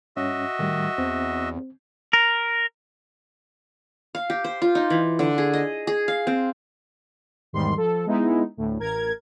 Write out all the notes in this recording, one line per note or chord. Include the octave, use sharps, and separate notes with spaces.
G2 C#4 F#4 D#5 E5
A2 D#3 G3
E2 C4
A#4
F5
G4
C5
F4
D#4
E3
D3
G#4
D#5
G#4
F5
C4
E2 G#2 D#3 G3 C6
F3 A4
G#3 B3 D#4 E4
D2 A2
A1 A#4 G#6